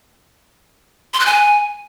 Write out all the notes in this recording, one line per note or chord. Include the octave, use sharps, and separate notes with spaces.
C6
F#6
G#5